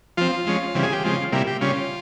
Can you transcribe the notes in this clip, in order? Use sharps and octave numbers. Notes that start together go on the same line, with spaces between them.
F3 C4 F4
F3 G#3 C#4
C#3 E3 G3 C4
G#4
G4
C#3 F3 G#3 C4 F4
C3 G3 A#3 E4
G4
C#3 G3 C#4 F4